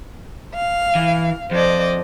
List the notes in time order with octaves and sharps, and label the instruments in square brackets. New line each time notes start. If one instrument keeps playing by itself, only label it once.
[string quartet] F5
[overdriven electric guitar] E3
[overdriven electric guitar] F2 [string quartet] C5 D5 D#5